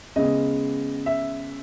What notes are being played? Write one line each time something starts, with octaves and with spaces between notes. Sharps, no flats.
C#3 G#3 B3 D#5
E5